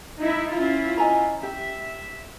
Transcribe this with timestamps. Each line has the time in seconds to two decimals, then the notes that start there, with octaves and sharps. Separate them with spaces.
0.19 D#4 E4
0.52 C#4 E4 F4
0.98 D#5 G#5 A#5
1.43 G4 E5